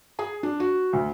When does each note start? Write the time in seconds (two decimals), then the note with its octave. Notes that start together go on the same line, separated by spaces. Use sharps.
0.19 G#4
0.43 D4
0.60 F#4
0.93 D2